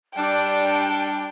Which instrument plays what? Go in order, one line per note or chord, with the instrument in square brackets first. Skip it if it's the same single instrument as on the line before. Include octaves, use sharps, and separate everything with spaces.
[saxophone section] G3 D4 [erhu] G5 [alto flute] A5